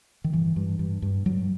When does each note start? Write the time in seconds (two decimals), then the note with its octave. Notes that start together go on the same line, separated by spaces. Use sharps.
0.24 D#3
0.33 G2 E3
0.56 G2
0.79 G2
1.02 G2
1.26 G2 F#3